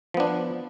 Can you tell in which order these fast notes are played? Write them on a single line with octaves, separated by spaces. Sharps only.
F3 B3 D4